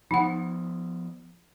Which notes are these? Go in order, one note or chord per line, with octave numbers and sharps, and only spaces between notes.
F3 B3 D#4 F#5